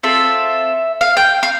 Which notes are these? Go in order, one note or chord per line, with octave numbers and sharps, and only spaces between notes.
C4 F4 A4 E5
F5
G5
F5